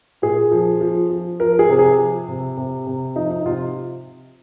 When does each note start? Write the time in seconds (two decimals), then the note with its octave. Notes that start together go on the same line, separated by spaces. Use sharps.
0.22 A#2 G#4
0.51 F3
0.81 F3
1.11 F3
1.40 F3 A#4
1.59 G#4
1.69 C3
1.79 G#4
1.98 F3
2.28 C3
2.57 C3
2.87 C3
3.16 F3 D#4
3.31 D#4
3.46 C3 F4